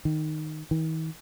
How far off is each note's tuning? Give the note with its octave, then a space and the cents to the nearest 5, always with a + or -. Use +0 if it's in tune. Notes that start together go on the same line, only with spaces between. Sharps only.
D#3 -5
D#3 +45